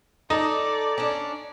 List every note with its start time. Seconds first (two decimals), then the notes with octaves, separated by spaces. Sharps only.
0.30 D#4 A4 D5
0.98 C#4 D4